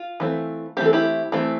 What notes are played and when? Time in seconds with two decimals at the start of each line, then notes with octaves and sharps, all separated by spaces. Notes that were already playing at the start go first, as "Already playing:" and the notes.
Already playing: F4
0.20 E3 A3 C4
0.77 E3 A3 C4 G4
0.86 A4
0.93 E4 G4
1.32 E3 A3 C4